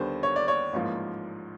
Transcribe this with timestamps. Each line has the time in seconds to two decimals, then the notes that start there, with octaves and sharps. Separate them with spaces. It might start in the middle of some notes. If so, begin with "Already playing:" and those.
Already playing: D#2 D3 G3 B3 C5
0.23 C#5
0.36 D5
0.48 C#5
0.73 A1 G#2 F3 A#3